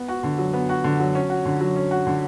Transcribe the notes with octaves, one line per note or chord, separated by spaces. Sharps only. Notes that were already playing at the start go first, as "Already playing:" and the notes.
Already playing: B3
F#4
D3
F#3
B3
F#4
D3
F#3
C#4
F#4
D3
F#3
C#4
F#4
D3